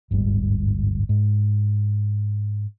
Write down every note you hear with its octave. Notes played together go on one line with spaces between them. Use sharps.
D1 G1 G#2 G3
G#2